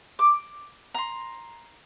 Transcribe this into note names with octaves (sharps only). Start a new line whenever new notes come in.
D6
A#5 C6